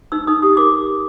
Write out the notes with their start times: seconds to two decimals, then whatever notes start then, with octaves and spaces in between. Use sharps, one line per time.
0.12 D#4 E6
0.27 D#4 D#6
0.42 G4 D#6
0.57 A#4 D6